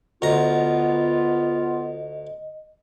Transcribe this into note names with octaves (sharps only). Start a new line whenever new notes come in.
D2 B3 F4 D#5 A#5